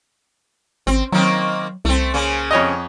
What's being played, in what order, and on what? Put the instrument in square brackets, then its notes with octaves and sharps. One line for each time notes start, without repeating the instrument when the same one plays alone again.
[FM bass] G#1 [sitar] C4
[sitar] D#3 A#3 C4 [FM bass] F#3
[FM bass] C2 [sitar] A3 C4
[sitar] C#3 A#3 C#4
[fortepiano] F2 C#5 D#5